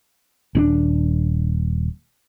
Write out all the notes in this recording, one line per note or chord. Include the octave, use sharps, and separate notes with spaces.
D#1 C#4 D4